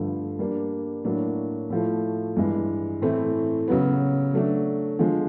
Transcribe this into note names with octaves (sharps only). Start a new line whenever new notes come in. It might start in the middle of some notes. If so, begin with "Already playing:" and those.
Already playing: G2 D3 F3 A3
G3 A#3 D4
A2 F#3 A#3 D4
A2 F3 A3
G2 E3 G#3
A2 E3 A3 C4
C#3 F#3 B3
F#3 A3 D4
D3 F3 G#3